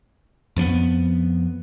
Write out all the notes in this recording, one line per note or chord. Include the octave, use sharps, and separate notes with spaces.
F2 F3 A#3 B3